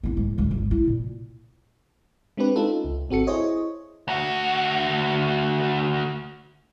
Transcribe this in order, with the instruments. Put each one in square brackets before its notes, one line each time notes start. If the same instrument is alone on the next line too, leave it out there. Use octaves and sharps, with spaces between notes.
[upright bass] B3 E4
G#2
D2 G#2
G#1
E4
A#2
[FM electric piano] G#3 C4 D4 G4 B4
C#4 D#4 F4 A4
C#2
G#1 C4 F#4 A4 C#7
E4 G#4 C5 C#5 D#5
[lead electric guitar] D2 F#4